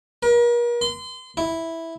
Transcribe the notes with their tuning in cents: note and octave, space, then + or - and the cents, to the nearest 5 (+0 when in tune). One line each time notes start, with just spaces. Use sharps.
A#4 +40
C6 -30
E4 -5